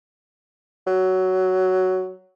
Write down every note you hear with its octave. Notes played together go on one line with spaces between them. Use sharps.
F#3